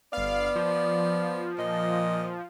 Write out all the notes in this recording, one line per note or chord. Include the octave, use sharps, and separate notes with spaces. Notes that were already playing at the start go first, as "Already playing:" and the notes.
G1 B3 D5 F5
F3
A#2 D#5